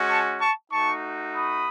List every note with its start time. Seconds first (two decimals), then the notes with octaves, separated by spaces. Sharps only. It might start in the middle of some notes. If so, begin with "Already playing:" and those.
Already playing: G#3 C#4 F#4
0.09 A5 C#6
0.40 A5 C#6
0.72 A3 D#4 F#4 A5 C#6
1.34 B5 D#6